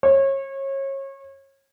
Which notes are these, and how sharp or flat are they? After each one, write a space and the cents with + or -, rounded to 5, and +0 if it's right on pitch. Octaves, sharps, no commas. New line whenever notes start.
C#5 -30